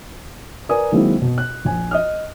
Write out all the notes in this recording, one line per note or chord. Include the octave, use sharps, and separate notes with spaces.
A#4 B4 D5 G#5 D#6
D#3 F#3 G#3 A#3 C4 E4
B2
F#6
A#1 G#5
D#5 D#6 F6